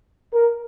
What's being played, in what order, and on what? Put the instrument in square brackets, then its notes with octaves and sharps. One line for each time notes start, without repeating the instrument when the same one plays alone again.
[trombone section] A#4